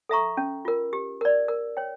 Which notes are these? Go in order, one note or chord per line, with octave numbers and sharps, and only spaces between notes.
A4 E5 A#5 C#6
C#4
F4 A#4
G4
A#4 D5
A#4
C#5 G5